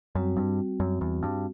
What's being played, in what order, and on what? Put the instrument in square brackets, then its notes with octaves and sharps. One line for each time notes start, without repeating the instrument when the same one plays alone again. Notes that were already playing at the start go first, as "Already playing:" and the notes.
[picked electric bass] F#2 [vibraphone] G3 C4 F#4
[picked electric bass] G2
F#2
E2
G2